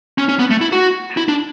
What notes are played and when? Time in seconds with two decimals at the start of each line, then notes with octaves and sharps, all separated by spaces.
0.18 C#4
0.29 C#4
0.39 B3
0.51 A3
0.61 E4
0.73 F#4
1.17 E4
1.28 D4